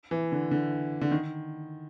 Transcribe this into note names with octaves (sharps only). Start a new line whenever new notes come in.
E3
D3
D3
D3
D#3